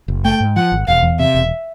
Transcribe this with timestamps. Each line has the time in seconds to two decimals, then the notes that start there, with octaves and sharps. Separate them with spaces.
0.08 F#1
0.25 A3 G5
0.40 G#2
0.56 F3 F#5
0.72 G#1
0.87 E1 F5
1.03 E2
1.19 C3 E5
1.34 E1